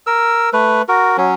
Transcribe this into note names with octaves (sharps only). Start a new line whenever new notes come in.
A#4 E6
A3 B4
F#4 A#4
F#3 C#4